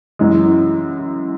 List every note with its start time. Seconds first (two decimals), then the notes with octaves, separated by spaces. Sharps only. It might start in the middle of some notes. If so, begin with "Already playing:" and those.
0.19 F#2 E3 G#3